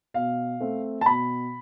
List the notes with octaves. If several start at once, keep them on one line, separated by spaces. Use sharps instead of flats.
B2 F5
A3 C4
A5
B2 B5